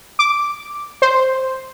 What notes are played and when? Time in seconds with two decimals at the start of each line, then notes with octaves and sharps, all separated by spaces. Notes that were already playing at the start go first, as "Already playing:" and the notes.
0.19 D6
1.02 C5